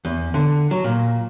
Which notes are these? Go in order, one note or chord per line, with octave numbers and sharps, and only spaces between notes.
E2
D3
F#3
A#2